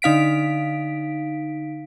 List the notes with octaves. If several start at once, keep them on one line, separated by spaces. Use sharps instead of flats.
D3 D#4 F5 B6 D7